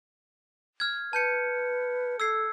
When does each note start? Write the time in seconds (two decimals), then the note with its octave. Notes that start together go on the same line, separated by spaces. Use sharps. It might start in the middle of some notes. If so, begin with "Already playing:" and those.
0.80 F6 G#6
1.13 B4 A5 G6 C#7
2.20 A4 E6 G#6 C7